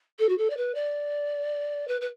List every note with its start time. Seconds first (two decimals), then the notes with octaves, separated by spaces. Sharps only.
0.19 A4
0.29 F#4
0.38 A4
0.50 D5
0.57 B4
0.75 D5
1.88 B4
2.01 B4